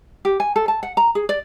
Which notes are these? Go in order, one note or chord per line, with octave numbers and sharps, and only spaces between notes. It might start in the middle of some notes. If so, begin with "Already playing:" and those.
G4
G#5
A4
A5
F#5
A#5
G#4
D5